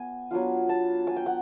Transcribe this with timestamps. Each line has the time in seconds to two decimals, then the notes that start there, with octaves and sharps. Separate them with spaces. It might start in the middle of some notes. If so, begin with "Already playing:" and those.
Already playing: B3 G#5
0.31 F#3 B3 D4 F4
0.69 A5
1.07 G#5
1.16 G5
1.26 F#5